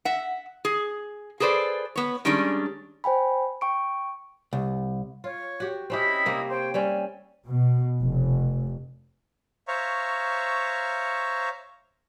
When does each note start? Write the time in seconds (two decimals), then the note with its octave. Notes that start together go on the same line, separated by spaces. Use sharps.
0.05 E5 F#5
0.65 G#4
1.40 G#4 A4 B4 C5 D5
1.96 B3 C#5
2.25 D#3 G3 G#3 C#4 D4
3.04 C5 G5 G#5 B5
3.61 G5 C#6 D7
4.53 C2
5.24 F4 C#5
5.60 F#4 G4
5.90 C4 C#4 E4 G4 D#5 B5
6.26 C3 A#3 C4
6.48 C5 C#5 G5
6.74 G3 C4 C#4 G#5
7.47 B2
8.00 F1
9.68 C5 C#5 E5 F5 A#5 C#6